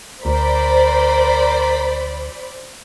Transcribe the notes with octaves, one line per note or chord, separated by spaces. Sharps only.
D2 A#4 C5 D5 B5